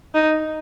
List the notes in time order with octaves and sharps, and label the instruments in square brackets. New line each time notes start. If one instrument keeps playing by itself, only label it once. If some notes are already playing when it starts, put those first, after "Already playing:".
[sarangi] D#4